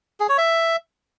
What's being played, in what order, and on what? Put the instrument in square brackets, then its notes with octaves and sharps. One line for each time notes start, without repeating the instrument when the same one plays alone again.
[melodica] G#4
C#5
E5